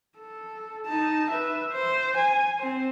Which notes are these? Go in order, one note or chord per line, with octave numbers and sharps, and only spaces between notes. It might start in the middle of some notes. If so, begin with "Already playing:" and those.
A4
D#4 A5
B4 E5
C5
G#5
C4 C5